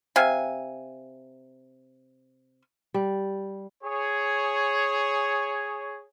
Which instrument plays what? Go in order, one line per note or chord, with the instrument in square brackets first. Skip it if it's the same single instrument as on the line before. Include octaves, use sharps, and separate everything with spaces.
[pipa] C3 F5 G#5
[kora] G3
[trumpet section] G#4 C#5